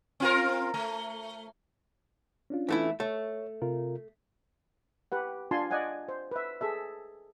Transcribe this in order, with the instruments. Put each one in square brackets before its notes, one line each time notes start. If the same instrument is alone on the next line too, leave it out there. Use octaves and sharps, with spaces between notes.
[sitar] C4 F4 A#4
A3
[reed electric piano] C#4 D4 F4
[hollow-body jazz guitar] E3 A3 E4
[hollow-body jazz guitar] A3 [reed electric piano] C#5
[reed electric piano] C3 F4 A#4
[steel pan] G4 B4 F#5
D4 F4 G#5 A5 C6
D5 D#5 F#5 G#5
C5
B4 E5
G#4 A4 E5